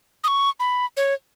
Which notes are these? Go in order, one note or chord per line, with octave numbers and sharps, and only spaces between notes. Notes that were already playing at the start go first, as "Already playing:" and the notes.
D#6
C#6
B5
C#5